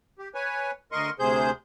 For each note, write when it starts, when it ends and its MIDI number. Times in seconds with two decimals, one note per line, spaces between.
0.19 0.28 67
0.35 0.71 71
0.35 0.71 73
0.35 0.71 80
0.92 1.10 38
0.92 1.10 70
0.92 1.10 75
0.92 1.10 84
0.92 1.10 85
1.19 1.51 38
1.19 1.51 48
1.19 1.51 68
1.19 1.51 72
1.19 1.51 91